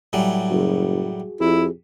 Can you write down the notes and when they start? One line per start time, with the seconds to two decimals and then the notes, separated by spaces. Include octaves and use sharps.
0.13 A2 F#3 G3 G#5
0.51 F#1 F#4 G#4
1.40 F2 E4 G4 G#4